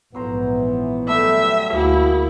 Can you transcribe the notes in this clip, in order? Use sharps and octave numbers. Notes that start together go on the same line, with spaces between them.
A#1 G#2 E3 F#3 B3 C5 A#5
F#3 G3 A3 E5
D2 A#3 E4 F#4 G#4